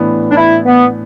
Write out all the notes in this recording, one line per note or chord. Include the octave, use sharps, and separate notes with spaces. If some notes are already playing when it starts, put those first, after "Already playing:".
Already playing: A2 E3 B3 D4
D4
E4
B3